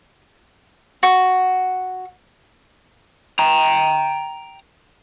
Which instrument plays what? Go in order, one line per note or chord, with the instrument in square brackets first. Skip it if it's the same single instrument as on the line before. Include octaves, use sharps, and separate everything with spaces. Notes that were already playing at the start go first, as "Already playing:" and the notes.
[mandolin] F#4
[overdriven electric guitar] G5 A#5